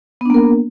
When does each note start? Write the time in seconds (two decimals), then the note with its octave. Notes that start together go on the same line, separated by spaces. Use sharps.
0.21 B3
0.25 D4
0.30 A#3
0.34 A#4